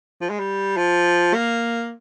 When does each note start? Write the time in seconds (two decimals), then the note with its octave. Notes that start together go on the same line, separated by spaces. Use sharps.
0.21 F3
0.30 G#3
0.40 G3
0.77 F3
1.34 A#3